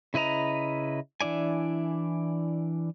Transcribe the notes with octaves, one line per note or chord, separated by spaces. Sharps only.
C#3 E4 B4 D#5 A#5
E3 D4 E4 D5 G#5